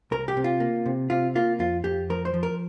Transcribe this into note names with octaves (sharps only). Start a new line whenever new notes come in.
C2 A#4
G4
C3
F4
A#3
C3
C3 F4
A#3 F4
F2 F4
F2 G4
F3 A#4
C5
F3
A#4